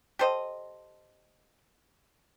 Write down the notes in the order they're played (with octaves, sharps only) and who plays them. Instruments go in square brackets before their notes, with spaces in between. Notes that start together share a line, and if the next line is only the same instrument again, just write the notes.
[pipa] G4 A4 C5 D#5